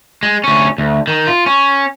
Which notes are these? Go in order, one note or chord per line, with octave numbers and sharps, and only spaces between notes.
G#3
D2 C#4
D2
D#3
F4
C#4